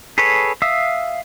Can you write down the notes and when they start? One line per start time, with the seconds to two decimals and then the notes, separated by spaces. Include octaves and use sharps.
0.18 G#4 A4 B4 C#5
0.62 E5 F5 D#6 E6